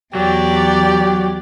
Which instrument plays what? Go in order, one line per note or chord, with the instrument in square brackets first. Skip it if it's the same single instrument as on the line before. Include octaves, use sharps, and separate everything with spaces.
[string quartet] E2 G4 D5 [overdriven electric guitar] F#3